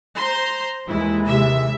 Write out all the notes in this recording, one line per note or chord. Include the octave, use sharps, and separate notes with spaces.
C5 A#5 C6
D#2 E3 G#3 E4
C3 E5